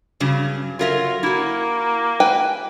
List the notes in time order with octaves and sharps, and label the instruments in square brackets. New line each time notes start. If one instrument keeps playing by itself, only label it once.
[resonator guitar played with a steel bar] G2 C#3 F#3
[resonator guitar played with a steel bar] F#3 A#4 E5 [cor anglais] F4
[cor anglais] A#3 [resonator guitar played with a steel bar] E4 F#4
[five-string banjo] B4 G5 G#5